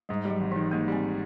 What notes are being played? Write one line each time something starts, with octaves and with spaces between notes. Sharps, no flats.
G#2 G3
G3
F#3
G#1
D#3 E3
G#2 A#3
G3 C4